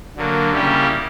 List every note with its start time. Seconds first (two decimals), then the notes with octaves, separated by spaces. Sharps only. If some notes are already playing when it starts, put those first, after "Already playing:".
0.16 D3 F#3 A#3
0.52 C#3 G3 A#3 E4 G4